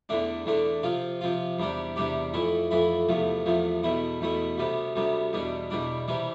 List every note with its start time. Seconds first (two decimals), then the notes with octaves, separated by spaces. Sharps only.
0.09 E2 D3 A3 D4
0.46 E2 D3 A3 D4
0.83 C3 F3 C4 F4
1.21 C3 F3 C4 F4
1.59 E2 C3 G3 D4 G4
1.96 E2 C3 G3 D4 G4
2.34 F2 E3 A3 E4
2.71 F2 E3 A3 E4
3.09 E2 C3 F3 A3
3.46 E2 C3 F3 A3
3.83 E2 B2 A3 E4
4.21 E2 B2 A3 E4
4.58 D2 C3 G3 B3
4.96 D2 C3 G3 B3
5.33 E2 B2 G3 D4
5.70 E2 B2 G3 D4
6.08 C3 E3 G3 C4